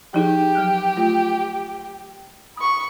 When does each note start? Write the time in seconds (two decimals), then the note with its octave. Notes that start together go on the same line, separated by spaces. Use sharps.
0.14 F3 D#4 G4 G#4
0.55 F#3 F6 F#6
0.97 A3 F4
2.57 B5 C#6 D#6